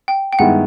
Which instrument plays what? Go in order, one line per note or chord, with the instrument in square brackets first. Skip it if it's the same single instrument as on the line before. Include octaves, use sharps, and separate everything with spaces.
[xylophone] G5
G5
[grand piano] G2 D#3 G#3 B3 E4 [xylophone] F#5